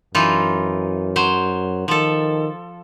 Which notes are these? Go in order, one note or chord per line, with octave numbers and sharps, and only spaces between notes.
F#2 E3 D#4 F4
F#3 C5
D#3 F3 A4